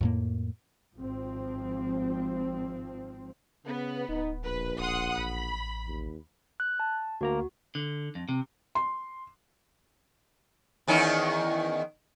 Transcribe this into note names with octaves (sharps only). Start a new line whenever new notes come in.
F2 A2 A#3
G#1 F3 C4
C#3 B3
D1 D#4
A#1 B4
D1 F#5 C6 D#6
A1 B5
D#2
F#6
A5
D2 A#3 F#4 A#5
D3
F2
C3
C6
E2 D#3 C#4